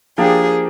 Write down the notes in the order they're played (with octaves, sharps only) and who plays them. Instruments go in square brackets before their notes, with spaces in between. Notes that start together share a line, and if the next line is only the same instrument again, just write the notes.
[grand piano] F3 A#3 D4 G4 [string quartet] G#4